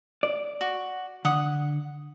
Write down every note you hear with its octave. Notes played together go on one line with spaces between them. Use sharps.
D5
F#4
D3 F#5 D#6